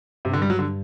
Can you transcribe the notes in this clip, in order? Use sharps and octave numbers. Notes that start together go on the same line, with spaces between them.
G2 C3
D3
G3
F#3
D3